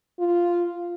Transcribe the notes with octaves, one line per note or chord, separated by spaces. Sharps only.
F4